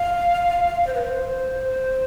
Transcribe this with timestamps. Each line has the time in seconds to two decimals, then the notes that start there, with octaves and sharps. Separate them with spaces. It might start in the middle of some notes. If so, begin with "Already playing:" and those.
Already playing: F5
0.87 C5
0.94 B4
1.02 C5